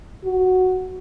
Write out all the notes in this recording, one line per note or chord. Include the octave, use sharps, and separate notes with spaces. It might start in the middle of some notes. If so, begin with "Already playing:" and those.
F#4